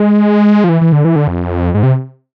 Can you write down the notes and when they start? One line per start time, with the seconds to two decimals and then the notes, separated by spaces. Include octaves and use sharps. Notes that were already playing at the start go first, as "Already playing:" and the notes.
Already playing: G#3
0.64 F3
0.69 E3
0.81 E3
0.92 D3
1.05 E3
1.16 D3
1.28 F2
1.75 G#2
1.83 C3